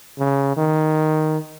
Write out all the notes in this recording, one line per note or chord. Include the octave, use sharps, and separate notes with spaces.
C#3
D#3